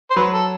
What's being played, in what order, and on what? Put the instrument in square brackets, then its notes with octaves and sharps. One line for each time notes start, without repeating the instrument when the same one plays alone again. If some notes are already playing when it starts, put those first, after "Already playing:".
[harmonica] C5
[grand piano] F#3 [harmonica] B4
[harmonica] A4